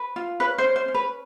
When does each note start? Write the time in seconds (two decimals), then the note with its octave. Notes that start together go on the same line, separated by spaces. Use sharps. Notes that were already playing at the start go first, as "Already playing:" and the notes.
Already playing: B4
0.16 F4
0.40 C#4 B4
0.58 C5
0.64 C#4
0.76 C5
0.88 C#4
0.94 B4